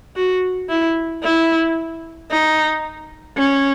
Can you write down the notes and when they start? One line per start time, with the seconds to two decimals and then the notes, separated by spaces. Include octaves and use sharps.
0.16 F#4
0.69 E4
1.23 E4
2.31 D#4
3.37 C#4